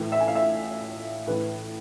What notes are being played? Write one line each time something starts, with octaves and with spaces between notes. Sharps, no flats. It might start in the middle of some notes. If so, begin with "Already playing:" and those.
Already playing: A2 E3
E5
G#5
F5
E5
A2 E3 B4